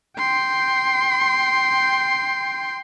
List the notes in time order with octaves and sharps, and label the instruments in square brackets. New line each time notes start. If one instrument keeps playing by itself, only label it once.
[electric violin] G5 C6